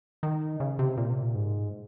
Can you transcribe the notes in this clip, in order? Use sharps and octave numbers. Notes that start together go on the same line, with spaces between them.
D#3
C#3
C3
A#2
C3
A#2
G#2